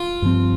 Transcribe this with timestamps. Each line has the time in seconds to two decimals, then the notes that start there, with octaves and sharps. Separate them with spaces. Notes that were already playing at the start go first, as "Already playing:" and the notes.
Already playing: F4
0.22 G2 F3 C4